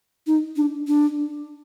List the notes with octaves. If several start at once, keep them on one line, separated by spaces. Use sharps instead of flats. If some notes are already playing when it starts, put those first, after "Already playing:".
D#4
D4
D4